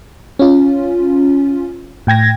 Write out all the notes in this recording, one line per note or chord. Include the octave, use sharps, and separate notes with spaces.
C#4 F4
A2 G5 G#6 A#6